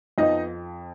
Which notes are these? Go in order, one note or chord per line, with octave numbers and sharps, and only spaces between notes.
F2 F3 B3 D#4 D#5